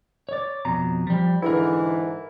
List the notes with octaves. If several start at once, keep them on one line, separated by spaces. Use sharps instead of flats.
C#5 D5
F2 B2 A#5
F3 G3
G#2 D3 E3 E4 A#4